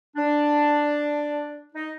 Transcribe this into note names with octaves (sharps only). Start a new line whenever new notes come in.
D4
D#4